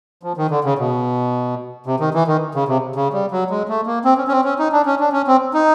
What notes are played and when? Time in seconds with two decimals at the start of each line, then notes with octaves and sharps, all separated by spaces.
0.23 F3
0.37 D#3
0.50 D3
0.64 C#3
0.79 B2
1.86 C3
2.00 D#3
2.14 E3
2.28 D#3
2.55 C#3
2.68 C3
2.96 C#3
3.13 G3
3.31 F#3
3.50 G#3
3.69 A3
3.86 A#3
4.05 C4
4.17 C#4
4.28 C#4
4.32 C4
4.45 C#4
4.59 D#4
4.72 D4
4.86 C#4
5.00 D4
5.12 C#4
5.27 C4
5.54 D#4